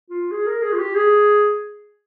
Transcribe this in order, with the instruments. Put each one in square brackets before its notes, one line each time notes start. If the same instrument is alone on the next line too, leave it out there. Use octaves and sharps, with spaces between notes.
[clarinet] F4
G#4
A#4
G#4
F4
G4
G#4